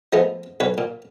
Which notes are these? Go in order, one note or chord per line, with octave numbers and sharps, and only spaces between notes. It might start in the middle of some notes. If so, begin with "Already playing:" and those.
F3 G#3 A3 B3
B1 B4 C#5
A#2